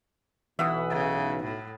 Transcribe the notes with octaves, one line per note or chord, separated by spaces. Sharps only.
B1 E3 E5 F#5 D#6
C#3
A2